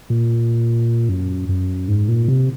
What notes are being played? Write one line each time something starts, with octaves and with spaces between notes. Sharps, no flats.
A#2
F#2
F#2
G#2
A#2
C3